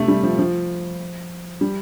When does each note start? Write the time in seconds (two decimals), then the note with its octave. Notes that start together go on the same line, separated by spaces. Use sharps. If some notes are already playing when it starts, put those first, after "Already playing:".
Already playing: C3 A3
0.08 G3
0.23 F3
0.39 F3
1.61 G3